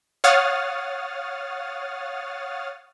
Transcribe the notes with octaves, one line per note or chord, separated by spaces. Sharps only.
C#5 F5 F#5 D#6 F6 A6